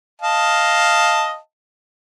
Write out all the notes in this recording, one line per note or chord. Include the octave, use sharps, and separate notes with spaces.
D#5 F5 A5